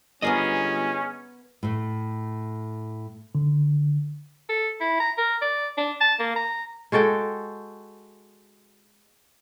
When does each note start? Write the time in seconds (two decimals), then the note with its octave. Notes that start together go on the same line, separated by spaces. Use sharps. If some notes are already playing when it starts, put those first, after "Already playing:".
0.22 G1 B3 C#4 G#4 A#4 D5 D#5
1.63 A2 A3
3.35 D3
4.49 A4
4.81 E4
5.00 A#5
5.18 A#4
5.42 D5
5.78 D4
6.01 A5
6.19 A#3
6.36 A#5
6.92 G#3 F#4 A4 G5